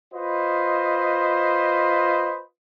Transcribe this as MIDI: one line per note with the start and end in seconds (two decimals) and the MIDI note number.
0.13 2.42 65
0.13 2.42 71
0.13 2.42 72
0.13 2.42 75